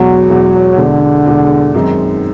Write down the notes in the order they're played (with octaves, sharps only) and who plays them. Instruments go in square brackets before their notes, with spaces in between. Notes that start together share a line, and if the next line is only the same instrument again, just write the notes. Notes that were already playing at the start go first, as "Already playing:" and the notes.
Already playing: [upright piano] E2 B2 G#3 [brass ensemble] F#3
[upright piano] E2 B2 G#3
[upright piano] E2 B2 G#3 [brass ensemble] D3
[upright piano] E2 B2 G#3
F#2 D#3 G#3 C4 D#4